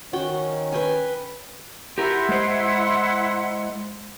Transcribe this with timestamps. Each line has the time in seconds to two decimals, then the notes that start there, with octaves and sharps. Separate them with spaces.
0.13 D#3 C#4 F#4 G5
0.72 B4 G5 G#5
1.98 E4 G4 A#4 F#5 C6
2.29 G#3 C5